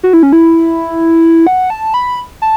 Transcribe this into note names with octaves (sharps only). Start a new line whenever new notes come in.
F#4
E4
C#4
E4
F#5
A5
B5
A5